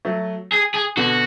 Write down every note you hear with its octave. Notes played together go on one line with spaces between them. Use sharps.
F#3 A3
G#4
G#4
B2 D3 F#4